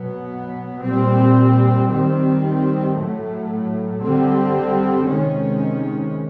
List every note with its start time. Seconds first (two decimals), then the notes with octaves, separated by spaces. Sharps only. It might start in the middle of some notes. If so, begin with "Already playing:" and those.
Already playing: B2 F#3 B3
0.83 A#2 G3 C4
1.89 D#3 G3 C4
2.95 A2 F#3 A3
4.01 D3 G3 C4
5.08 C3 D#3 G#3 C#4